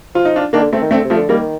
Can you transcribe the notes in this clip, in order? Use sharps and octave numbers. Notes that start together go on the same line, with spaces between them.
F3 F4
D#4
D4 F4
D#3 A#3 D4
D3
A3 C4
D#3
D3 A3 C4
C3
F3 A3
D3
D#3 G3 A#3